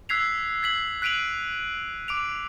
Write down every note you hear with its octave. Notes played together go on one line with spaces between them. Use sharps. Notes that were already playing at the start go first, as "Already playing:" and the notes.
E6 F#6 G#6 B6 C7 F7
G#6 B6 F#7
F#6 B6 D7 D#7 F7 F#7
D6 D7 F7